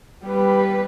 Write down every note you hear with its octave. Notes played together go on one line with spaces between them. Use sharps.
G3 B4